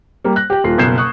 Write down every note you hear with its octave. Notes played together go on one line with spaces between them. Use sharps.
G3 A#3
F#6 A#6
G4 G5
D#1 F4 C7
F#1 B2 G6 G#6 C7 E7
C#6 D#6 F#6